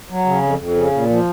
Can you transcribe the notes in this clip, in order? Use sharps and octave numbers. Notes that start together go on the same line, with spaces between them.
F#3
C#3
F2
F2
C#3
A#2
F3